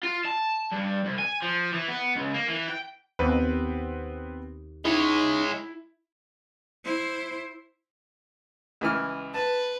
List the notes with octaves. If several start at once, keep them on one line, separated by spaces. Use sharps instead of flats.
F4
A5
G2
C2
G#5
F3
E3
B3
C#2
A#3
E3
G5
D#2 B3 C4 B4
G#3 D#4 E4 C#5
E4 C5
C#2 E3 F6
B4 A5